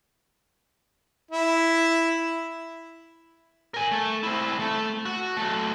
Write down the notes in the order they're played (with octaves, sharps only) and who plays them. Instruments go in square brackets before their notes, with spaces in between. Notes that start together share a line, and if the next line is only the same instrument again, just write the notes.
[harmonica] E4
[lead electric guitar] A#4 G#5
A3
C4 E4
A3
F#4
F#3 A3